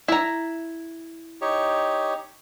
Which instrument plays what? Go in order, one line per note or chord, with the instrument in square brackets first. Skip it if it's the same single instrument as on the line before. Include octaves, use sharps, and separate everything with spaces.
[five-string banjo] E4 A#5
[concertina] D#4 G4 C#5